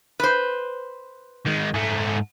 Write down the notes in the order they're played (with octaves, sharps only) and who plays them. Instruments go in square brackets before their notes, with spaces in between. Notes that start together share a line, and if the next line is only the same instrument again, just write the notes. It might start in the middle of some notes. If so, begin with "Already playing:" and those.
[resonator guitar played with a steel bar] B4 C5
[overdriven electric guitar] D#3 G#3
G#2 A3